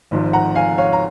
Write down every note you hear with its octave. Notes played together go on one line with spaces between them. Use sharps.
G#1 G#2 F3
F#5 A#5
F5 G#5
C#5 F5
A#5